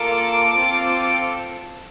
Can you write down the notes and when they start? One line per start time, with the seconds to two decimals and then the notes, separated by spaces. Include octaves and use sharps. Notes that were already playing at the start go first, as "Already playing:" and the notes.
Already playing: A#3 F4 A4 D6
0.56 C4 F4 A4